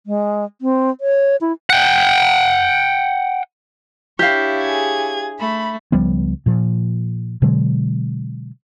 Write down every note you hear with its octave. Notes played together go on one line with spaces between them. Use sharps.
G#3
C4
C#5
E4
F#5 G5
D4 E4 G4 C#5 F5
G#4 G#6
A3 B5
C#2 F3 G3 B3
A#2 F3
B2 D3 F#3 G#3